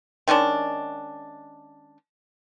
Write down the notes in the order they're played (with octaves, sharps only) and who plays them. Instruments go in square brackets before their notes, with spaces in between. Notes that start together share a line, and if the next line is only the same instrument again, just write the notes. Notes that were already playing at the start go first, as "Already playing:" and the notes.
[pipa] D#3 G#3 C#4 D4